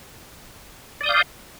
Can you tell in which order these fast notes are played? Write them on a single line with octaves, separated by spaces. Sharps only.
D5 D#6 G6 F5